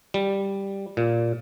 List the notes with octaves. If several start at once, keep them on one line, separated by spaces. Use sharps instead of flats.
G3
A#2